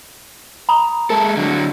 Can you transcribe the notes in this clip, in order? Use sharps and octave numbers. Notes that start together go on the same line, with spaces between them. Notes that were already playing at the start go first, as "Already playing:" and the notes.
A#5 B5 D#6
G#3 A4 A#4 A5
D3 F#3